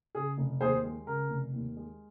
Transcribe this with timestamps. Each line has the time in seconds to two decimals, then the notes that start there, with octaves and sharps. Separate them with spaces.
0.15 C#3 G#4
0.38 F1
0.61 D#2 G#4 C5
0.84 G#3
1.07 C#3 A#4
1.30 F1
1.53 D#2
1.76 G#3